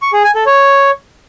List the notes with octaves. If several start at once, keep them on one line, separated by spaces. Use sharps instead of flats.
C#6
G#4
G#5
A4
C#5